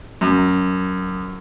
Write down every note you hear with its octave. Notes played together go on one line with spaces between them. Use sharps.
F#2